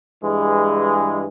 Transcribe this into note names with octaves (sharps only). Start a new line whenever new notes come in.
G2 E3 G#3